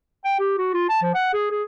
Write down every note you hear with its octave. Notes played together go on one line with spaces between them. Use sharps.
G5
G4
F#4
F4
A5
F3
F#5
G#4
G#4